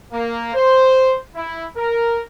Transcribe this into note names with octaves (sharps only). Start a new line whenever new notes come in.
A#3
C5
E4
A#4